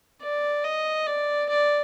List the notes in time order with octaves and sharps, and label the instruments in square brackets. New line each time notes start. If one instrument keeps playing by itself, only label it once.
[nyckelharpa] D5
D#5
D5
D5